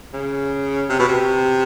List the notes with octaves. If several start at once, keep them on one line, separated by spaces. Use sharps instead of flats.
C#3
C3
B2
C3